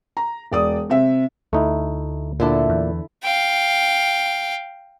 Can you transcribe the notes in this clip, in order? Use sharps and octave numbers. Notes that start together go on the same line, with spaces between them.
A#5
E1 D5 D#6
C3 C4 E5
D2 A3 D#4 E4
A#2 D3 D4 E4 A4
E2
F5 G5